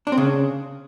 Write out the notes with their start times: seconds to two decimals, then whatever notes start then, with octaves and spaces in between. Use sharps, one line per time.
0.07 D4
0.12 C4
0.18 C#3